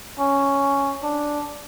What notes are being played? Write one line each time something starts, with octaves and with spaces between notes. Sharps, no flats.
C#4
D4